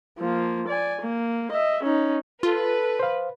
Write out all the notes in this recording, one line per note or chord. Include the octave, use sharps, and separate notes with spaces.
F3 A#3
D5 G#5
A#3
D#5 E5
C#4 D#4
F4 A4 B4
C5 F5